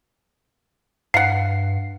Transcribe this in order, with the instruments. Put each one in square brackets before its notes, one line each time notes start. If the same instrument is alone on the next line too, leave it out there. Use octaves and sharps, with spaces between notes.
[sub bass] G2 [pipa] F5 F#5 [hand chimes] C7